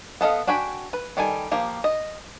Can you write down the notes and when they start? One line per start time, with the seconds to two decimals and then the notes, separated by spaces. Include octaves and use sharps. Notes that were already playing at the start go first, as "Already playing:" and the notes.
0.21 B3 A4 D#5 F5
0.47 D4 F#4 G5 G#5 B5
0.93 B4
1.17 D#3 G3 A4 G#5
1.51 F3 A#3 G4
1.84 D#5